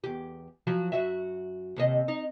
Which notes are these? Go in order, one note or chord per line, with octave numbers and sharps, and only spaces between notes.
E2 G4
F3 F#3 F#4
F#2 F#4 E5
D#2 C3 D#5
D#4